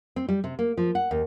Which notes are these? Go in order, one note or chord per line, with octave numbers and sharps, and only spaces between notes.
C4
G3
C3
A#3
F3
F#5
D#2